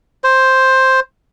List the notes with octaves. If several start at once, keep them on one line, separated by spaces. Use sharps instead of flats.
C5